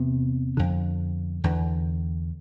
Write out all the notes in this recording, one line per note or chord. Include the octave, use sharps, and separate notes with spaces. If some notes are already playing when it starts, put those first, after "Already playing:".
Already playing: E2 C3 B3
F2 D3
E2 D3